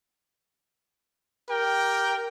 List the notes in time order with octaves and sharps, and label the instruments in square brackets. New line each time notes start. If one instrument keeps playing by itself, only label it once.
[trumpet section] G4 A#4 G5